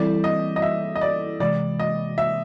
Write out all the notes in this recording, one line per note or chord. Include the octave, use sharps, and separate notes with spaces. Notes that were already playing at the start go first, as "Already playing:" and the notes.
Already playing: E3 G3 C4 E4 A4 D5
D#5
D#5
E5
D#5
D5
C3 E3 G#3 D5
D#5
E5